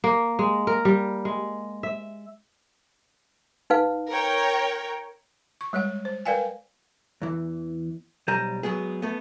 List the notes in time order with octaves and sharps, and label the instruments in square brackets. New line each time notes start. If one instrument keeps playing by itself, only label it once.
[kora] A#3
G#3
A#4
G3
G#3
E5
[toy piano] D#4 B4 F5
[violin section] A#4 C#5 G5
[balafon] C#6
G3 G#3 C#5 F#5
C5
A#4 B4 D5 F5 G5 G#5
[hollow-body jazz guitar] E2 E3
B1 G3 C5 G#5 A#5
F#3 G#3 B3 G#4
A3 B3